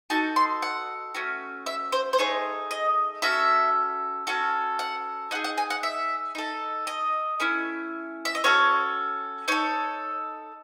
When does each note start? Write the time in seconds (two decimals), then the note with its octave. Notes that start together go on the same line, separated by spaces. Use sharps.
0.10 D#4 F#4 A4 A5
0.36 C6
0.62 F#5
1.15 A3 C#4 F#4
1.66 E5
1.92 C5
2.13 C5
2.18 A3 D#4 G#4 C#5
2.71 D#5
3.22 C#4 F#4 A4 E5
4.27 C#4 F#4 A4
4.79 F#5
5.31 D#4 F#5
5.35 G#4
5.44 F#5
5.58 G#5
5.70 F#5
5.83 E5
6.35 D#4 A4
6.87 D#5
7.40 A3 C#4 E4
8.25 E5
8.35 D#5
8.44 C#4 F#4 A4 C#5
9.48 D#4 A4 C#5